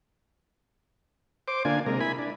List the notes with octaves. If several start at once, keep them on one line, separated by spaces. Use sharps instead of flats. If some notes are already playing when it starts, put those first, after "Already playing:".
C5 D6
D3 A#3 D4 F4 G#5
C3 G#3 A#3 A#4
E4 G#5 B5
D4